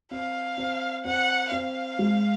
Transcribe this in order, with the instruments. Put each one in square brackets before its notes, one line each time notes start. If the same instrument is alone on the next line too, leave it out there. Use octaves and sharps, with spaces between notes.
[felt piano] C4 [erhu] F5
[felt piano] C4
[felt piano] C4 [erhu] F#5
[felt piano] C4 [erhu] F5
[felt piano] G#3